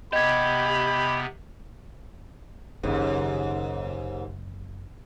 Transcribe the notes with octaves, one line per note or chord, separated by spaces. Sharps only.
C3 B3 G4 D#5 B5 G#6
F#1 D#2 G#2 C#3